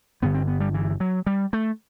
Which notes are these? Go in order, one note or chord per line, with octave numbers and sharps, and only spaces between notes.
G1 G2 D3 B3
C4
B3
G3
E3
F#3
G3
A3